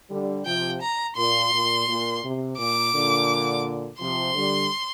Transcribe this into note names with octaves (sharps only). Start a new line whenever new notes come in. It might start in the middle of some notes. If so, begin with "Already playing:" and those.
D3 G3
C3 F3 G5
A#5
A#2 C6
A#2
A#2
C3
A#2 D6
A#2 D3
C3 F3 C6
D3 G3